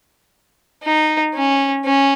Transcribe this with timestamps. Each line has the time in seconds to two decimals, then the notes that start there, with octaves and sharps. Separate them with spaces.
0.84 D#4
1.35 C#4
1.85 C#4